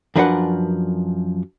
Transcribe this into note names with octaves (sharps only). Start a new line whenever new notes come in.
F#2 F3 D4 A#4 B4 F#5